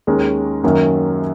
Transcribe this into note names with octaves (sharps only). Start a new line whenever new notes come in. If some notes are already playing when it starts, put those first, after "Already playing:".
D#2 D#3 G#3 C#4 A#4
F#2 D#3 F#3 A#3 C#4